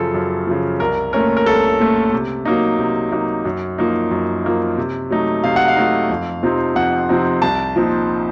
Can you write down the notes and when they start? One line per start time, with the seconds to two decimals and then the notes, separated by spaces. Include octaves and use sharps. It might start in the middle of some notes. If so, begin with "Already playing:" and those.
Already playing: F#2 C#3 F3 A4
0.14 F#2
0.47 C#3 F3
0.80 C2 A#4
1.13 A#2 A3 C#4 A#4
1.37 A#4
1.46 C2 A4
1.79 A#2 A3 C#4
2.12 C3
2.45 F#3 A#3 D#4
2.79 C3
3.12 F#3 A#3 D#4
3.45 F#2
3.78 F3 A#3 D#4
4.11 F#2
4.44 F3 A#3 D#4
4.78 C3
5.11 F#3 A3 D#4
5.44 C3 F5
5.56 F#5
5.68 F5
5.76 F#3 A3 D#4
6.10 F2
6.43 C3 F3 C4 D#4
6.76 F2 F#5
7.09 C3 F3 C4 D#4
7.42 C2 A5
7.75 A#2 F3 C4 D#4